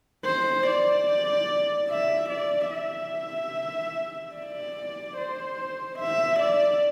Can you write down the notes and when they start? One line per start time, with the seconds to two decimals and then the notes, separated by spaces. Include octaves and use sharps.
0.25 C5
0.67 D5
1.90 E5
2.30 D5
2.71 E5
4.35 D5
5.17 C5
5.99 E5
6.40 D5